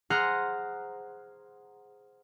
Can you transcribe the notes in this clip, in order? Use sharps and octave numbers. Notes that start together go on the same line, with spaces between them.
G#4 C5 F#5 A#5 F6 F#6